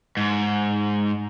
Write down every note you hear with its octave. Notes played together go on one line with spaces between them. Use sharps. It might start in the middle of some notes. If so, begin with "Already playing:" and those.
G#2